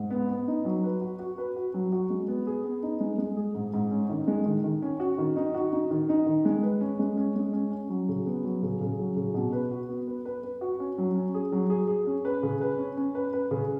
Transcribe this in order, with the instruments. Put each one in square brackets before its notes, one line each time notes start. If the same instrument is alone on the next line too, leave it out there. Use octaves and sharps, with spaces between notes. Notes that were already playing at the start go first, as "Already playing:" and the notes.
Already playing: [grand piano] G#2
B3
B3
D#4
F#3
B4
F#4
F#4
B4
F#4
F#3
F#4
G#3
B3
G#4
B3
D#4
G#3
G#3
G#4
G#2
G#2
C#4
D#3
G#3
D#3
D#3
C#4
F#4
D#3
D#4
F#4
D#4
D#3
D#4
D#3
G#3
B4
C#4
G#3
C#4
G#3
C#4
C#4
F#3
C#3
B3
F#3
C#3
C#3
F#3
C#3
B2
B4
F#4
B3
B4
B4
B4
F#4
C#4
F#3
C#4
G#4
F#3
G#4
G#4
C#4
B4
C#3
B4
C#4
C#4
B4
B4
C#3